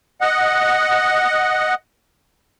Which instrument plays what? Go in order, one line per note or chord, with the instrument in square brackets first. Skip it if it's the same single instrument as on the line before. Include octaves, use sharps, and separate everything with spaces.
[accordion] D#5 F#5